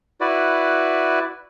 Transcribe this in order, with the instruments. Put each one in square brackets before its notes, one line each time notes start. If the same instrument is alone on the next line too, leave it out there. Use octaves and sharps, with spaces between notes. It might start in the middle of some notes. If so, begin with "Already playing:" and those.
[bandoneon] E4 F#4 B4 D5